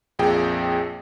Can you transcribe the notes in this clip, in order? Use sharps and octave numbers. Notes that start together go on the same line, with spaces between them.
A#1 F2 A#2 G#4 G5